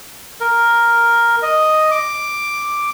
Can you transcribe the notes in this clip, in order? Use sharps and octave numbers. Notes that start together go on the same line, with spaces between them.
A#4
D#5
D6